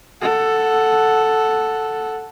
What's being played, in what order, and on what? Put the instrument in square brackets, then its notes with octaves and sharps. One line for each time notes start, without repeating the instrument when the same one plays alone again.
[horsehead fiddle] A4 F#5